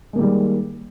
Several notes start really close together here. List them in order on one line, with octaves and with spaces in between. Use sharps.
G#3 A#3 D#3 G3